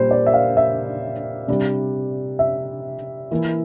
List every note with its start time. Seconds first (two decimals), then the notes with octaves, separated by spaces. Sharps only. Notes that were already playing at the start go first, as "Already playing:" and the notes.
Already playing: A#2 G3 A#3 D4 C5
0.11 D5
0.26 E5
0.34 F5
0.57 E5
1.48 C3 G3 D4
2.39 E5
3.31 E3 A#3 E4